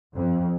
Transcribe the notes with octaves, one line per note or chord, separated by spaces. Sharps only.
F2